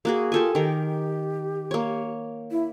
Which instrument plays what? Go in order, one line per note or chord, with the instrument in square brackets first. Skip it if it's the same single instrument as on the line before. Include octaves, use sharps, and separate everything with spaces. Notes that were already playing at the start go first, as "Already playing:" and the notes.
[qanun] A#3 F#4 G#4
[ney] F4 [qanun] G4 A4 G#5
[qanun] D#3 A#4 [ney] G4
[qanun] A#3 C#5
[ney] E4